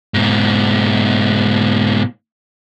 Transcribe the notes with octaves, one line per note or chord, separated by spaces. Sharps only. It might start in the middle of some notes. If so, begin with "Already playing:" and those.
G#2 B2